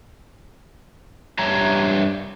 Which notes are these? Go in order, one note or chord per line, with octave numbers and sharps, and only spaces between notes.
G2 G3 D4 C#5 E5 A#5